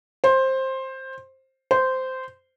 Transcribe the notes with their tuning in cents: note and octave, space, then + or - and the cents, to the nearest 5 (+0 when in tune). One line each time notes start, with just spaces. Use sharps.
C5 +15
C5 -10